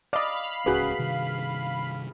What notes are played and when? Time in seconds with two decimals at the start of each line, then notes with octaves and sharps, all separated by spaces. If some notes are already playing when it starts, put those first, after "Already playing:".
0.13 D5 D#5 F5 B5
0.66 D1 C#2 C#4 F#4 G#4 B4
0.98 G2 C3 D#3